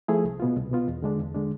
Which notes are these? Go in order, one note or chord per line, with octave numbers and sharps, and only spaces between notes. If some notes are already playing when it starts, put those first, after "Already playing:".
F3 A3 E4 G#4
C2
B2 B3 F4
C2
B2 B3 F4
E2
D3 G#3 D4
E2
D3 G#3 D4